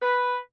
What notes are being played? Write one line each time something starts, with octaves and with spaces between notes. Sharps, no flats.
B4